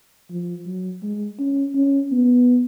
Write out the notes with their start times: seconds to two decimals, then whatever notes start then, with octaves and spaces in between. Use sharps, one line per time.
0.30 F3
0.66 F#3
1.03 G#3
1.39 C#4
1.75 C#4
2.12 B3